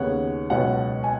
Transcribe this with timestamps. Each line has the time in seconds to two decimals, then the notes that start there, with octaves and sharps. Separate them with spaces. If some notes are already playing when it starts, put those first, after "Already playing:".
Already playing: D#2 C#3 B3 C#5 F#5
0.50 C#2 B2 F#3 B3 C#5 F#5
1.04 G#5